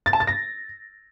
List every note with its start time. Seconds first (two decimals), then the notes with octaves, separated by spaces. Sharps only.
0.06 A6
0.13 A5
0.20 A6
0.27 A#6